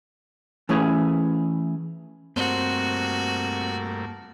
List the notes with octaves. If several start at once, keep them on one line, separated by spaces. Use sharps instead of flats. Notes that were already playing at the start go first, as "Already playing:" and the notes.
E3 A3 C#4 E4 G#4 C#5
G2 A3 A#3 C4 F#4